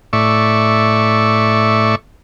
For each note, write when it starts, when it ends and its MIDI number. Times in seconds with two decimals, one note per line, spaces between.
0.13 1.95 45
0.13 1.95 74
0.13 1.95 76
0.13 1.95 85